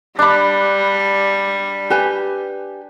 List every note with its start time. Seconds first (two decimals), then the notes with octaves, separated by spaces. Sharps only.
0.19 G3 D4 B5
1.90 G4 B4 G#5